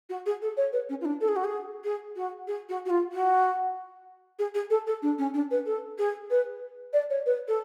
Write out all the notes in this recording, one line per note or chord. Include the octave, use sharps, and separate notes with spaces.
F#4
G#4
A4
C#5
B4
C#4
F4
D4
A4
G#4
F#4
G#4
G#4
F#4
G#4
F#4
F#4
F4
F#4
G#4
G#4
A4
A4
D4
C#4
D4
B4
A4
G#4
B4
D5
C#5
B4
A4